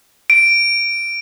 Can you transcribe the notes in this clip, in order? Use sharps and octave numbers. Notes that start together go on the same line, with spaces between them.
D7